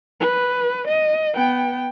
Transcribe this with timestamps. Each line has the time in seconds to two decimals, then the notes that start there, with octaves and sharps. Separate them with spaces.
0.21 B4
0.88 D#5
1.34 B3 G5